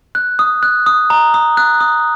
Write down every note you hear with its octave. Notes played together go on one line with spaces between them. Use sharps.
F#6
D#6
F#6
D#6
A#5
D#6
F#6
D#6